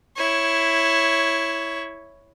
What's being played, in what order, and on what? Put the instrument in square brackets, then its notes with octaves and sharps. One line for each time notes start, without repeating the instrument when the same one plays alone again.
[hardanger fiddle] E4 C#5